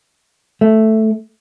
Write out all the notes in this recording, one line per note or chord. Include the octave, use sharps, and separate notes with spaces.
A3